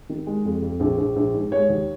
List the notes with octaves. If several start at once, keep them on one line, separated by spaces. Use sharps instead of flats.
D#3
G#3
F2
F2
A#1
A#1
A#1
G#2
G#3 C#5
D#2